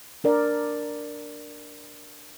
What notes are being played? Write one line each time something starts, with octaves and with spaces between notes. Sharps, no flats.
D4 A#4 D5